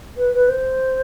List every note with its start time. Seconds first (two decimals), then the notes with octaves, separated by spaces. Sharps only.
0.17 B4
0.34 B4
0.49 C5